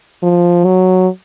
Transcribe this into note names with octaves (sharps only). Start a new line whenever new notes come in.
F3
F#3